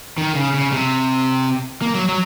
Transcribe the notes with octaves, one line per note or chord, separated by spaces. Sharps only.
D#3
C#3
C#3
C3
A#3
F#3
F#3